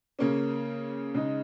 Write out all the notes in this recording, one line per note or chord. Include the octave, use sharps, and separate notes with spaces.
C#3 A#3 C#4
C#3 G#3 D#4